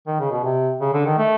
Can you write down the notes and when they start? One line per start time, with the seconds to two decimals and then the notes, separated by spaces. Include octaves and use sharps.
0.07 D#3
0.20 C#3
0.31 B2
0.44 C3
0.81 C#3
0.93 D3
1.06 D#3
1.18 A3